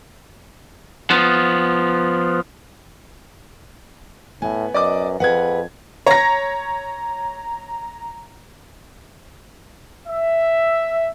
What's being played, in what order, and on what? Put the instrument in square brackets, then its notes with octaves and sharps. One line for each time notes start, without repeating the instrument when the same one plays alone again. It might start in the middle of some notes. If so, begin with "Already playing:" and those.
[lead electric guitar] F3 B3
[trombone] A2 [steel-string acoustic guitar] B3 [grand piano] G#5
[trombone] F#2 [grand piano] D5 D#5 D6
[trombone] F2 [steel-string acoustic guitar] G#4 B4 [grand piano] F#5 G#6
[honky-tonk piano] C#5 A#6 [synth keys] A#5
[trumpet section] E5